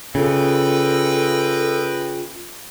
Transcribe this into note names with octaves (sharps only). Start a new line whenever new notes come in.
C#3 F4 A4 B4 D#5 G5